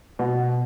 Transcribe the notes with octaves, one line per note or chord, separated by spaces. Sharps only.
B2